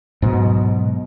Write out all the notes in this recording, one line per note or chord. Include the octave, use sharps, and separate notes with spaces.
G#2 B2 F#3